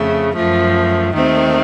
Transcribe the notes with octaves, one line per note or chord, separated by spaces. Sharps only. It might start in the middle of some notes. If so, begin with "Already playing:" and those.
Already playing: F2 C#3 A3
F#2 F3 A3
D#2 D#3 A3 C4